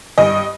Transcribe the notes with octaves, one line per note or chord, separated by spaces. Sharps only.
G2 D#5